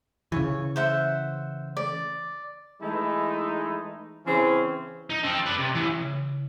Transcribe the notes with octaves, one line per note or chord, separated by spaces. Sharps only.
C#3 E3 C#5
C5 E5 F#5
D5
E3 G#3 A3 D#4 E4
C#3 E3 C4 C#4
D#4
C4 A4
B4 D5
C3
A2 E3
C#3